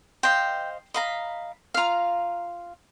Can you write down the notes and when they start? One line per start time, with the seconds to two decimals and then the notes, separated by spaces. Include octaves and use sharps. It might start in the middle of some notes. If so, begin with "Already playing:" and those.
0.23 C5 D#5 F5 G5
0.94 D#5 F5 A#5 B5
1.75 F4 F5 A#5 F6